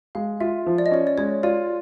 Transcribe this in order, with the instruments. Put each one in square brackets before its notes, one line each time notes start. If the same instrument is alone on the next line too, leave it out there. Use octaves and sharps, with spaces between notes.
[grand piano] G#3 [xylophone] F5
[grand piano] F4 [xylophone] E5
[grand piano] F3
[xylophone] D5
D#5
[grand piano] C#4 [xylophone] D5
[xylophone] D5
[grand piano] G#3 [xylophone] C#5
[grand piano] F4 [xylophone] D5